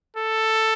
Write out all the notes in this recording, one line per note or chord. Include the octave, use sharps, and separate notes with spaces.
A4